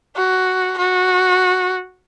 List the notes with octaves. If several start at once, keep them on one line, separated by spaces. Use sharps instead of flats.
F#4
F#4